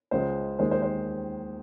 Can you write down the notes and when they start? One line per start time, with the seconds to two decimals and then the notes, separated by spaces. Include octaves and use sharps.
0.11 C#2 C#3 G#3 C5
0.59 D#2 D#3 G#3 C5
0.71 C5
0.82 C5